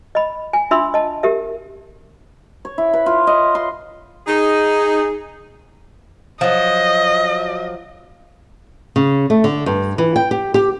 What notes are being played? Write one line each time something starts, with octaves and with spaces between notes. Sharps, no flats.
D#5 B5
G#5
D4 F4 E5 B5 C6 E6
D#5 A5
G4 A#4 E5
C#5
E4
B4
F4
D#5
C6
D#4 G#4
F3 F#3 D#5
C#3
A3
D3
G2
E3
G5
G4
G4